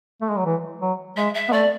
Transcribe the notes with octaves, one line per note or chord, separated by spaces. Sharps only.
A3
G#3
F#3
E3
F#3
G#3 E5
E5
B3
A3 D5